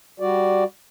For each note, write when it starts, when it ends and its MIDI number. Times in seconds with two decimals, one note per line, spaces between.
0.20 0.64 55
0.20 0.64 66
0.20 0.64 74